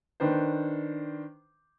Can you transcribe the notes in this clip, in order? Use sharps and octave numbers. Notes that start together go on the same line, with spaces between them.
D#3 D4 B4 C5